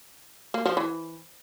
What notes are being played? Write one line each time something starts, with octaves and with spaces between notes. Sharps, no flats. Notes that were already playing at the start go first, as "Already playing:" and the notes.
A#3
F3
E3